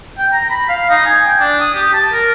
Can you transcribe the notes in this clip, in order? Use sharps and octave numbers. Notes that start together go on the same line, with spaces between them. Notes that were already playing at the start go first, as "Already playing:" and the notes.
G5
A#5
B5
F5
D#4
G#5
G5
D4
D#6
G4
A5
A#4